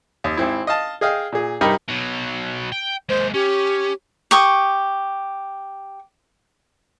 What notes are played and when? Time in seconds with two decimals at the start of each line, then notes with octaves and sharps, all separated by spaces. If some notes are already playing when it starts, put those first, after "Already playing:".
0.24 D#2 D#5
0.37 G#1 C4 E4
0.67 D#5 F5 A5
1.01 G#4 D#5 F5 G5
1.32 A#2 G#4
1.61 G2 C3 D#4 G4 A#4 B5
1.89 B2 F#3
2.72 G5
3.09 G#3 A#3 C5
3.34 C#4 G4
4.31 G4 C#6 D#6